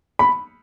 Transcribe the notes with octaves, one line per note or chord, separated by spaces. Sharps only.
B5